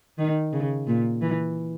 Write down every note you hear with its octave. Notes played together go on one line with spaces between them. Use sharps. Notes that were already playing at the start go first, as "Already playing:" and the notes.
D#3
C#3
A#2
E3